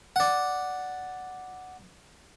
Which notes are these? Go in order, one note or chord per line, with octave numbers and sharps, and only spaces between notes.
D5 F#5